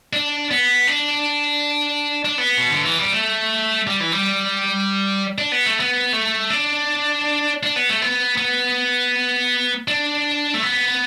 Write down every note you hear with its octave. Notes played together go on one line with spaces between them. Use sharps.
D4
B3
D4
D4
B3
B2
D3
E3
G3
A3
G3
E3
G3
D4
B3
A3
B3
A3
D4
D4
B3
A3
B3
B3
D4
A3
B3